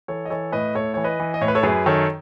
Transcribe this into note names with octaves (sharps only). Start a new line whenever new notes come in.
E3 A4 C#5
D#5
E3 A4 C#5
A2 B4 D#5
A2 A4 C#5
E3 C#5
B4 D#5
E3
D#5
A2 C#5
B4
A4 C#5
F#2 G#4 B4
D#3 A4 C#5